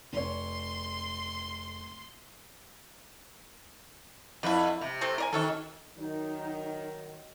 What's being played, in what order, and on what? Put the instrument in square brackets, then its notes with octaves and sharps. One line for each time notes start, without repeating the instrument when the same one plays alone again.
[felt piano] F1 C#5 [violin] C6
[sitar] F2 B4 [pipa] D3 E4
[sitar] C3
[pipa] A3 C4 A4
A#4 D5 G#5
[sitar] D#3 A4 [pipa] F#3 C#4 C#5
[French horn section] D#3 F#3 [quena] D#4